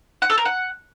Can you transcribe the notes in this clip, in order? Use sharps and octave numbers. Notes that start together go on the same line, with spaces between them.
F#5
A4
A#4
F#5